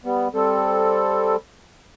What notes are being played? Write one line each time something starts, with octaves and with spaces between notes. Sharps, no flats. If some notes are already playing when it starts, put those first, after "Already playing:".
G3 B3
G3 C4 A4